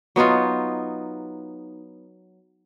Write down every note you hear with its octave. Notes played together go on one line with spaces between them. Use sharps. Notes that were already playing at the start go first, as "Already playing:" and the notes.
F#3 B3 D#4 F4